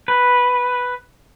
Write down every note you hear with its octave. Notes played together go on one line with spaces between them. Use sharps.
B4